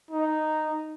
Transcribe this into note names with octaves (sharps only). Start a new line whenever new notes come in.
D#4